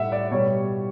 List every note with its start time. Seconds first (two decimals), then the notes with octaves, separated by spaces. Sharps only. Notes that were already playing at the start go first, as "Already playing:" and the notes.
Already playing: A2 G3 E5 F#5
0.12 D5
0.31 B2 G3 C#5